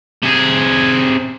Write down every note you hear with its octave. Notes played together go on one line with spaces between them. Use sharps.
C3 G#4